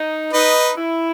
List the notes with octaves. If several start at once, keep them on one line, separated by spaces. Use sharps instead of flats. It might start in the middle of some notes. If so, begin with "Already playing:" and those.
Already playing: D#4
D#4 B4 D#5
E4